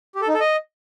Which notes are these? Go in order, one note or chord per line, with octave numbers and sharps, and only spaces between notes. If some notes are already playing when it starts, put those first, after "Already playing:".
G4
A4
D#4
A4
D#5